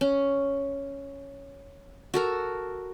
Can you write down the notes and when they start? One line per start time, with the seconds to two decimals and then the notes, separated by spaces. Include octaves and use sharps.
0.01 C#4
2.14 F#4 A4 A#4